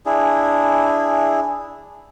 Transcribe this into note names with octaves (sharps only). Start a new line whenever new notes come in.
D4 E4 G#4